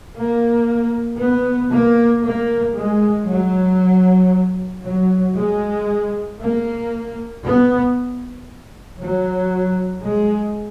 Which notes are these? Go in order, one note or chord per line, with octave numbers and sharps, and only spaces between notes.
A#3
B3
A#3
A#3
G#3
F#3
F#3
G#3
A#3
B3
F#3
G#3